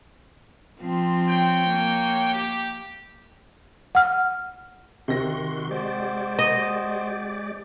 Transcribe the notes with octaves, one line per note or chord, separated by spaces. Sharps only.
F3 C4
F#4 C#5 G5
A#3
G4
F#5 F6
C3 D#3 F#4 C6 A#6
G#3 F#4 G4 C5 D5
D#5